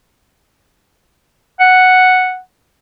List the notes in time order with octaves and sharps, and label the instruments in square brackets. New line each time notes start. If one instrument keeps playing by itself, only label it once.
[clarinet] F#5